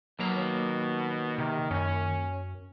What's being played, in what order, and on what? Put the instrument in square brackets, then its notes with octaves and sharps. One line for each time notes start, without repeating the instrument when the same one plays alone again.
[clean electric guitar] D#2 A#3 A#5 [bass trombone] B2 [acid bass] F#3
[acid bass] C3 [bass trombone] D#3
[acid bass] F#2 [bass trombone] C#4